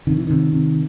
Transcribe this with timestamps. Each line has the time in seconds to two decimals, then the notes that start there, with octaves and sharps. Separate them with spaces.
0.07 C3 D#3
0.17 E3
0.27 C3 D#3
0.53 C3